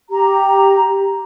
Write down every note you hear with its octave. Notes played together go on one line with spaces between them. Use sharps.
G4 A#5